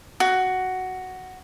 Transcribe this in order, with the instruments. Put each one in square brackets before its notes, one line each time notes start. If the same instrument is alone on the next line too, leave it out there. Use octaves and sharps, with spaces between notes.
[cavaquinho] F#4